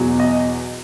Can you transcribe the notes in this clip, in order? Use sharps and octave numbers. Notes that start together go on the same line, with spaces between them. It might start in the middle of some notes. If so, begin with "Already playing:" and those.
Already playing: E2 B2 F#3
D#5